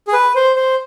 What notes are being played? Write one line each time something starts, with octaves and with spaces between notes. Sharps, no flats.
G#4
B4
C5
C5